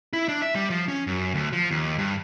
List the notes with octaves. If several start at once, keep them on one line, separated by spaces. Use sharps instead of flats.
E4
D4
E5
G3
F3
C#4
F#2
D2
F3
D#2
G2